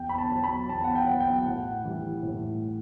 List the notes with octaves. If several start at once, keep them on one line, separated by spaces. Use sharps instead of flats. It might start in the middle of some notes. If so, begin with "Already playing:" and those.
Already playing: E2 G5
B5
A5
B2 F#3
B5
E2 A5
F#5
G5
B2 F#3
G5
A2 F#5
E3 G3
A2